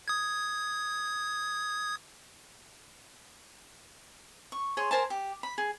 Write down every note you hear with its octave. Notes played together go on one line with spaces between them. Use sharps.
D#6 G#6
C#6
G#4 C#5 C6
A#4 C5 G#5 A5
G4
B5
G#4